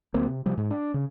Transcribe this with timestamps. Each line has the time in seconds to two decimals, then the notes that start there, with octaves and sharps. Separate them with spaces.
0.14 D2 F#3 A#3 C4
0.27 C3
0.46 C3 F3 G3
0.57 G#2
0.70 D4
0.94 C#3